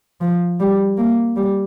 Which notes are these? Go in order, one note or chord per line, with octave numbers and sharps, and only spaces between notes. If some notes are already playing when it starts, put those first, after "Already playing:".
F3
G3
A#3
G3